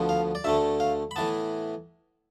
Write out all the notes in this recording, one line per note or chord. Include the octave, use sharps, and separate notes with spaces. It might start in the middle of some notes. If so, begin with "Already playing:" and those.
Already playing: D2 D3 F3 B3
F5
D5
D2 D3 A3 E5
F5
B5
A2 E3 B3 A5